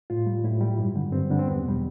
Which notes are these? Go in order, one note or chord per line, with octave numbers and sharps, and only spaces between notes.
A2 F4
G3
A2 E4
G3
G2
D3 G3
G2 C4
D3 G3 D4
C4
E2 B3
B2 G3